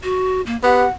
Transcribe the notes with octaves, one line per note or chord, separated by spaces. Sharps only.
F#4
A#3
B3 G4 F#5